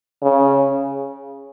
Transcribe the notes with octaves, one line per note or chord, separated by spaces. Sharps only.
C#3